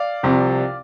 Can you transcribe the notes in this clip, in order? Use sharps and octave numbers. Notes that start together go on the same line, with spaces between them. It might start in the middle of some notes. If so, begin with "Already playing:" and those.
Already playing: D5 F5
C2 C3 F3